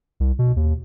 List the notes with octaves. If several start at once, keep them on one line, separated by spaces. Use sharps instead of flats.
C2
B2
D#2